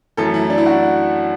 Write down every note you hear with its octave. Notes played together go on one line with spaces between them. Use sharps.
F#2 E3 A3 A4
E4
D4
E4
F#4